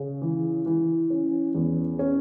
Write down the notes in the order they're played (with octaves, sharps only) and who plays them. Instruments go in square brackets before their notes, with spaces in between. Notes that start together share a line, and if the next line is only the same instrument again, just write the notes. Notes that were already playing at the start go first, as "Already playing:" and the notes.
Already playing: [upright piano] C#3
E3
E3
C#4
E2
C#4